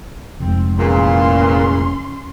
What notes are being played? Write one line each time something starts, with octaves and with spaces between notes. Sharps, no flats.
F1 G#2 C4
E2 A#2 C#4 C6